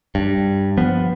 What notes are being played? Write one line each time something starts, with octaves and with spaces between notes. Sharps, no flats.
G2
F3 B3